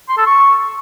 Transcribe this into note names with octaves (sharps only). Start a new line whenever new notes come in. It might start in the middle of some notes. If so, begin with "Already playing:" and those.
C6
A4
C#6